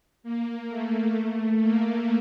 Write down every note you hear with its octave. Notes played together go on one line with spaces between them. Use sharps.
A#3
A3
A3
A#3